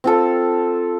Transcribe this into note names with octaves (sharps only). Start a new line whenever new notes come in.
C4 F4 A4